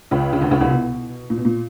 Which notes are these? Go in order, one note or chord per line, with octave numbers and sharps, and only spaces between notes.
C#2 C#3
C#3
D2 D3
C#2 C#3
C2 C3
B2
A#2
B2
A#2